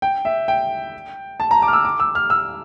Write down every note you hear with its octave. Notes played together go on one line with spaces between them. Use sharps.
G5
E5
G5
A5
A#5
D6
F6
E6
D6
E6
F6
E6